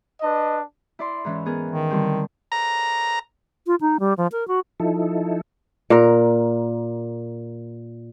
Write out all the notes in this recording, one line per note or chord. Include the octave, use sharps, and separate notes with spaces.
D4 B4 D#5
E4 D5 C6
G#2 E3 C#4
B3 G#4 A#4
D#3
D3 G3 C4
A#5
F4
D#4
G3
F3
A#4
F#4
F3 D#4 E4 A4
A#2 A#4